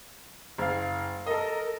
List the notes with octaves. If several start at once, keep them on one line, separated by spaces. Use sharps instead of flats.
F#1 F5
A4 A#4 D#5